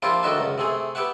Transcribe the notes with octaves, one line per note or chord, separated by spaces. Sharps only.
F3 A#3 D4 E4 F4 G4
D2 D3 D#3 D4 F#4 E5
C#2 F#2
C3 A3 G#4
B3 G4 E5 F#5